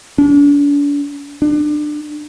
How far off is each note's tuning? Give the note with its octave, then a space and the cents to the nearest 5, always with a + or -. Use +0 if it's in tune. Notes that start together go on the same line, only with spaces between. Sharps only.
D4 -40
D4 +25